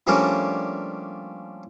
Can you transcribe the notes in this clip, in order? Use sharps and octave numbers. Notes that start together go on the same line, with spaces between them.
F3 G3 A3 A#3 C#4 D4